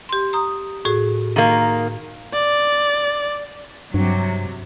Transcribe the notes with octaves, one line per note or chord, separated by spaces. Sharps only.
G4 C6
A#5 D#6
A2 F#4 G#4
D#3 A#3
D5
G2 C3 F#3